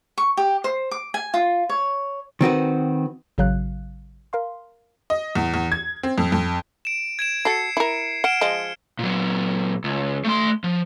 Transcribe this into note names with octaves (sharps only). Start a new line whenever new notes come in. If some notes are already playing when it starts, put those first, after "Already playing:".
C#6
G4
C5
D6
G#5
F4
C#5
D#3 C4 F#4 B4
A1 C#3 F#3 F5 F#6
A#4 F5 C6
D#5
E2
E2
G#6
C4
F2
F2
D7 E7
G#6 D7 E7
F#4 A4 C7 C#7
E4 A#4
F#5 F6 D7 E7
F3 G#3 D#5
A#2 F#3
C#2
A3 C6
F3